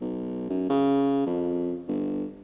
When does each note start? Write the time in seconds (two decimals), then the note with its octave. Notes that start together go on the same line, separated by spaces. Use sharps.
0.01 B1
0.49 F#2
0.69 C#3
1.26 F2
1.88 G1